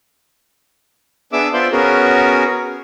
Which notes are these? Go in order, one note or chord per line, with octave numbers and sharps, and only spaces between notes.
B3 D4 G#4 E5 D6 E6
B3 F4 C5 D5 E5 C6
B3 C#4 F#4 G#4 A#4